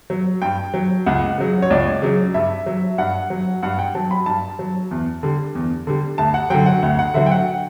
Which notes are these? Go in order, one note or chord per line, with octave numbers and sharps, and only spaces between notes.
F#3
G2 G5
F#3
C#2 F#5
C#3 F#3
C#5
C#2 D5
C#3 F#3
G2 E5
F#3
G2 F#5
F#3
G2 F#5
G5
F#3 A5
B5
G2 A5
F#3
E2
D3 G3
E2
D3 G3
D2 A5
F#5
D3 F#3 G5
F#5
D2
F#5
D3 F#3 E5
G5
F#5